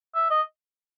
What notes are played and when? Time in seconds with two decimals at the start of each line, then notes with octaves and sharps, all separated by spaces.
0.15 E5
0.30 D#5